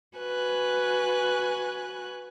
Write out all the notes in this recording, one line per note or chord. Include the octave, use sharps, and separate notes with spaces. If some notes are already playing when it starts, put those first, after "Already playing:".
F#4 B4 G#5 F#6